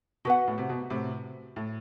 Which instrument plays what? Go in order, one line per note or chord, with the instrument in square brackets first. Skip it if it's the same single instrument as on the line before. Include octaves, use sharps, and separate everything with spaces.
[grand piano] B2 [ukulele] F#4 B4 F#5
[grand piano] A2
C3
B2
A2 C3
A2